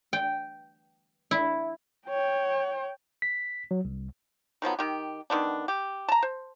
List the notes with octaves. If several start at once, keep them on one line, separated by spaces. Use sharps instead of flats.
G5
E4
C#5 G5
B6
F#3
C2
D#3 F3 F#3 B3
D#3 G4
D3 D#3 B3 D4
G4
A5 A#5
C5